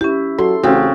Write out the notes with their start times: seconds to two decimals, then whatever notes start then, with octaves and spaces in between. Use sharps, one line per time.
0.01 C#4 E4 G4
0.38 F#3 A4 C6
0.63 A1 C#3 C4 F#4